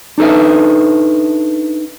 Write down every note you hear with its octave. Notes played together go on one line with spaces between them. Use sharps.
D4 D#4 A4 B4 E5